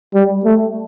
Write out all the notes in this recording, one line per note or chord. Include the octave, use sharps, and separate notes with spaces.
G3
A3